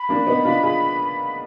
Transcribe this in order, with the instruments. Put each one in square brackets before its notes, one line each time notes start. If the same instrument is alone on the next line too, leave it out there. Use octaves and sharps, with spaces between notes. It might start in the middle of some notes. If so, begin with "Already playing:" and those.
Already playing: [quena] B5
[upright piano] A#3 D4
B3 D#4
D4 F4
F4 G#4